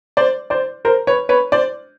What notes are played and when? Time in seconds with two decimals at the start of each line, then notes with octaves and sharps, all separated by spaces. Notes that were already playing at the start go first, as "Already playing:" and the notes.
0.17 C5 D5
0.50 C5 D5
0.85 A#4 C5
1.07 B4 C#5
1.29 B4 C#5
1.52 C5 D5